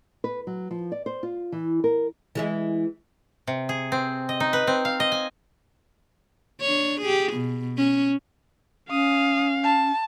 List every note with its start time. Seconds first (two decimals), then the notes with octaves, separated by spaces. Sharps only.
0.24 B4
0.47 F#3
0.71 F3
0.92 D5
1.06 C5
1.23 F4
1.52 E3
1.84 A#4
2.35 E3 G#3 E4
3.47 C3
3.69 G#4
3.92 C4
4.29 D#5
4.40 D#4
4.53 B4
4.67 C4
4.85 F5
5.00 D#5
5.12 G#5
6.61 D4 C#5
7.01 G4 G#4
7.32 B2
7.78 C#4
8.90 C#4 F5 D#6
9.64 A5